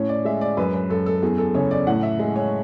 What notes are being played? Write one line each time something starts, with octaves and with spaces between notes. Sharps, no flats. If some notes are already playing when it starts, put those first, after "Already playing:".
Already playing: A2 C#4 C#5
D5
G#3 E5
D5
F#2 B4
B4
F#2 A4
A4
E2 G#4
A4
C#3 C#5
D5
A2 F#5
E5
G#3
C#5